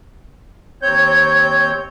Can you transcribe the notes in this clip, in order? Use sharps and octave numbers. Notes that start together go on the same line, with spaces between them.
D#2 C4 C#5 G6